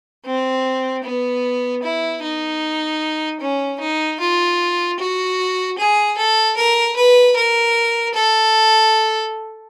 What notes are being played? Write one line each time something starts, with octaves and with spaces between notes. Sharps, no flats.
C4
B3
E4
D#4
C#4
D#4
F4
F#4
G#4
A4
A#4
B4
A#4
A4